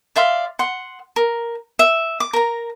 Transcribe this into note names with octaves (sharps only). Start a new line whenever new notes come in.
D5 E5 F5 C6
F#5 C6
A#4
E5
D6
A#4 A#5